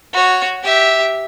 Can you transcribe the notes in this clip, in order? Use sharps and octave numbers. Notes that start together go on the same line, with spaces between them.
F#4 C#5
G4 E5